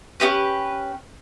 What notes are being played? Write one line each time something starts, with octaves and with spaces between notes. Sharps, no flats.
C#4 D#4 G4 B4